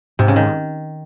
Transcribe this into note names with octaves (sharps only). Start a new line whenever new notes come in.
G#2 C3
C#3
D#3